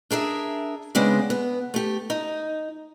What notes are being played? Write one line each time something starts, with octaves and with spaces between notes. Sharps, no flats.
D4 G#4 A#4 E5
C#3 G#3 B3 C4 D4
B3
A3 G4
D#4